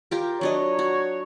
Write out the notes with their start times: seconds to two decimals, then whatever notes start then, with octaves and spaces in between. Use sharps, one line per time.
0.11 F4 G4 A#4
0.41 F#3 D4 C#5 D#5
0.79 F#4